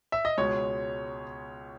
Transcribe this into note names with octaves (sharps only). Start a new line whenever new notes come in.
E5
D#5
C#2 B2 G#3 C#5